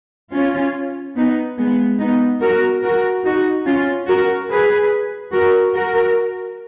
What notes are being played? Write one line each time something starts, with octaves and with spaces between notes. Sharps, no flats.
C#4 F4
B3 D#4
G#3 B3
B3 D#4
F#4 A#4
F#4 A#4
D#4 F#4
C#4 F4
F#4 A#4
G#4 B4
F#4 A#4
F#4 A#4